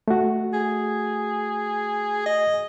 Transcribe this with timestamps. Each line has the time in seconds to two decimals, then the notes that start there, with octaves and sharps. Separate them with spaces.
0.08 A3 F#4
0.54 G#4
2.26 D#5